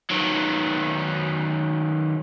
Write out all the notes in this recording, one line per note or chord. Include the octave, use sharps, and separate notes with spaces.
D#3 F#3